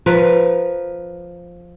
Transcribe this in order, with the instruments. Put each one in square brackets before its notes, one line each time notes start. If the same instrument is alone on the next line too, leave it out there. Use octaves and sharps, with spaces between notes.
[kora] F3 A#4 B4